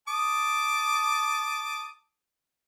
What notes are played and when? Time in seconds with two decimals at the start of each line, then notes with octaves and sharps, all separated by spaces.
0.08 A5 D6 D#6